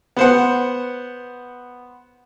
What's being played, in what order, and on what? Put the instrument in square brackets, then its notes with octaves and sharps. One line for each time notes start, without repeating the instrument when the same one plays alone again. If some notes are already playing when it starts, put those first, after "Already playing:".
[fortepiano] B3 C5 F#5